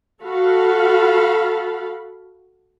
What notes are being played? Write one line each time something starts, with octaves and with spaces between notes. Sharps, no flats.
F#4 A4 F5 B5